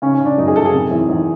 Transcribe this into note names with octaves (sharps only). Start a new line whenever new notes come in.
C#3 C#4
C#4
C#3
D4
F#2 D#4
G#4
F#2 A4
G#4
C3
E2
E2